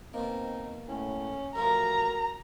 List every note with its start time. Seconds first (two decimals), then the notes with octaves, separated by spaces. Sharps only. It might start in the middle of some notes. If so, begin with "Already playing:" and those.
0.14 B2 A#3 C4 D#4
0.88 A2 C#4
1.56 A1 A2 F3 F#4 A#4 A#5